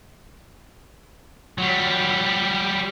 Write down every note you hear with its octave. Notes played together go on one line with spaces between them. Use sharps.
F#3 G3